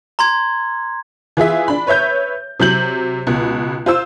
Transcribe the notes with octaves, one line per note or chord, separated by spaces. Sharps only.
A#5 C6 G#6
E3 F4 G#4 E5
D4 B5
B4 C#5 E5 G6
C3 F#3 G6 F#7
C#2 B2
F4 C5 E6